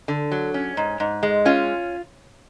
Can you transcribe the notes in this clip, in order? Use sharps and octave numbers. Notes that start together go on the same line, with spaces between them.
D3
F#3
C#4
G#2
G#2
G#3
C#4 F4